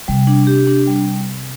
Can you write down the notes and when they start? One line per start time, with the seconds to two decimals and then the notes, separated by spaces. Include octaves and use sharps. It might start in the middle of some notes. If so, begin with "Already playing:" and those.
0.08 C3 G3
0.27 D4
0.47 G4
0.67 D4
0.87 G3